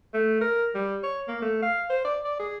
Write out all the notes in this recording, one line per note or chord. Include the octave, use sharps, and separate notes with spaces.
A3
A#4
G3
C#5
A#3
A3
F5
C5
D5
D5
G#4